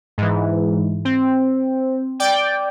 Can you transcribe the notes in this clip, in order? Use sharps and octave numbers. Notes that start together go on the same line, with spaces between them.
G#2 E3
C4
D5 G5